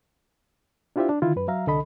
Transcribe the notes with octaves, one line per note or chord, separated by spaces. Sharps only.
D4 E4 F4 G4 C5 E5
D4
D3 D#3 E4 F4
F#2 B4
F#3 E5 F5 A#5
C2 D3 A4 D#5 B5